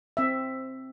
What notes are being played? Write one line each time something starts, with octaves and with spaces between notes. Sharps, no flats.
C4 E5